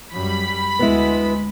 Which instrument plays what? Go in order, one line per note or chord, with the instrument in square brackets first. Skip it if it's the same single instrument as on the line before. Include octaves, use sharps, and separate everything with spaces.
[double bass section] F#2 G3 [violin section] B5
[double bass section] D2 G#3 [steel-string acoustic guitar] B3 E4